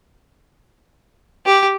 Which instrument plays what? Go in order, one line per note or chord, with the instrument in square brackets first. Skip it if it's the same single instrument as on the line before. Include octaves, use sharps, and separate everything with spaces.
[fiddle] G4